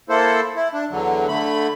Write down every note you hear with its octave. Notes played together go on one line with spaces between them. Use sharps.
A#3 E4 A4 C5
E4
D4
E2 D3 F#3
D3 A3 B5